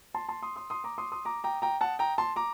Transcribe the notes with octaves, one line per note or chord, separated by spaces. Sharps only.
A5 C6
A5 C6
C6 D#6
C6 D#6
C6 D#6
A#5 D6
C6 D#6
C6 D#6
A#5 D6
G5 A#5
G5 A#5
F#5 A5
G5 A#5
A5 C6
A#5 D6